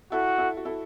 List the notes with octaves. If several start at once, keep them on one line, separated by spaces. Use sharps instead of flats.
E4 F#4 A4
E4 A4
F#4
E4 A4